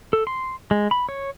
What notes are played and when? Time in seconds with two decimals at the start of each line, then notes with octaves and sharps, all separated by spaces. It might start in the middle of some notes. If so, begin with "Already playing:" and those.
0.13 A4
0.27 C6
0.71 G#3
0.91 B5
1.09 C#5